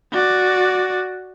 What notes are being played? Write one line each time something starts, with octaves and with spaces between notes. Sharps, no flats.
F#4 D5